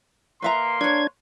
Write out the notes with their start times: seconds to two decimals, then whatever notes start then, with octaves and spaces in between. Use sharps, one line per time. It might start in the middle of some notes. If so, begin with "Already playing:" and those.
0.42 A#3 B4 E5 A#5 C6
0.81 D4 B4 C#5 G#6